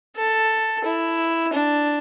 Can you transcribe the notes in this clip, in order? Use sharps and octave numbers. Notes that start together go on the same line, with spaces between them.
A4
E4
D4